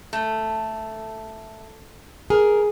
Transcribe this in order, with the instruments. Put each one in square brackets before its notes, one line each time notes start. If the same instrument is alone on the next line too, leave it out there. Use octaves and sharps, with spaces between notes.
[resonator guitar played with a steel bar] A3
[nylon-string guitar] G#4 [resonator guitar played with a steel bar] A#4